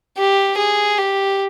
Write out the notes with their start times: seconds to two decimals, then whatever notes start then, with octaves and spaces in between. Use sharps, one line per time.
0.17 G4
0.57 G#4
0.98 G4